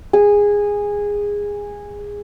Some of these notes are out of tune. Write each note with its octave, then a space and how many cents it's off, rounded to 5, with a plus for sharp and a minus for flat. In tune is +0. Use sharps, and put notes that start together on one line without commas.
G#4 -15